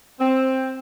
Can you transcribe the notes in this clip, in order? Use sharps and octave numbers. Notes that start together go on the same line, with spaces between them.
C4